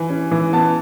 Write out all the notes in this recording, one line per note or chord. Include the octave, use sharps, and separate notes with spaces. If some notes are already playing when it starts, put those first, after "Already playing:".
Already playing: E3 G#5
C#4
E3
B3 A5